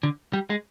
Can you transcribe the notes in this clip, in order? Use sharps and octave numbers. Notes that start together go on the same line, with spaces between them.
D3
G3
G#3